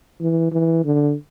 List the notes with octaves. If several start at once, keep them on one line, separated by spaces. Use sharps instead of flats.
E3
E3
D3